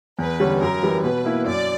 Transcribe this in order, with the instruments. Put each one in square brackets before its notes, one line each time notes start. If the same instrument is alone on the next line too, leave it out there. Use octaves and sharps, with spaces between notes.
[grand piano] E2 [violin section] B4
[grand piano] D3 G3 C#4
[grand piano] F#2 [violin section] A#4
[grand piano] E3 G3
[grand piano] B2 [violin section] B4
[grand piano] A#3 E4
[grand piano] F#2 [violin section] D5